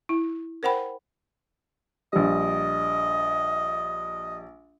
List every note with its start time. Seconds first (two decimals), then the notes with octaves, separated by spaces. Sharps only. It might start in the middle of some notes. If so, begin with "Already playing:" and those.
0.09 E4
0.63 A#4 C5 F#5 G5 B5
2.13 A#1 G3 D#5